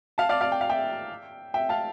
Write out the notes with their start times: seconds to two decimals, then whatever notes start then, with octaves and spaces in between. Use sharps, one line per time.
0.18 F5 A5
0.29 D5 F5
0.41 D5 F5
0.52 G5
0.61 F5
0.70 E5 G5
1.54 E5 G5
1.69 F5 A5